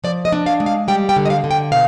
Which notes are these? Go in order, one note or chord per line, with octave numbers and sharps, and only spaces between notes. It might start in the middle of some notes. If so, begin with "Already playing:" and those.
F3 D5
D#5
D4
F5
G#3
F5
G3 G5
G5
D3
D#5
F5
D3
G5
B2 F5